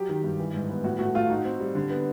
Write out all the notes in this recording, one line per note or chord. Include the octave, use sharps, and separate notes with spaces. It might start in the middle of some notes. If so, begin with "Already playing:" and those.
Already playing: F#3 G4
D#3
G2
E3
G#2
B3
A2 F#4
A3 F#4
A3 F4
D#4 F#4
C4
G3
D3
B3